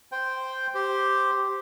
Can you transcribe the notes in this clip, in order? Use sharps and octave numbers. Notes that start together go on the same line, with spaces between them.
C5 G5
G4 C5